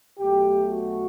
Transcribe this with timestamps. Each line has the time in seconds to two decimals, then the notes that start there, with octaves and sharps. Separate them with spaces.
0.19 B1 B2 F#3 A3 G4
0.69 F#4